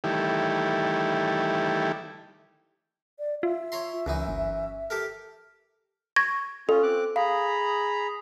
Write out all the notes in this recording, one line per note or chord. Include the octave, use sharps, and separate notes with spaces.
D#3 E3 G3 A3 E4 G4
D5
F4 E5
C#5 A#5 C6
C#2 F#2 E3 D#4
G1
G4 A4 A#4
C#6 G#6 A#6
C#4 F4 A4
C4 D6 F#6
G#4 F5 A#5 B5